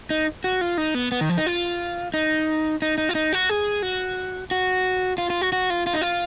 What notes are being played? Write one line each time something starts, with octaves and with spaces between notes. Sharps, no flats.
D#4
F#4
F4
D#4
B3
B3
D#3
F3
D#4
F4
D#4
D#4
D#4
F4
D#4
F#4
G#4
F#4
F#4
F4
F4
F#4
F#4
F4
F4
D#4
F4